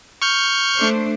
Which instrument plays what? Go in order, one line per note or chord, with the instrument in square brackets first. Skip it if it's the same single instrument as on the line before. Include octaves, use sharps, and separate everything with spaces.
[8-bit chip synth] C#6 F6 G6
[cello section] A3 D4 C5